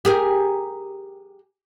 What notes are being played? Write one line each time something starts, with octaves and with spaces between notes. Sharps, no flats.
G4 G#4 A#4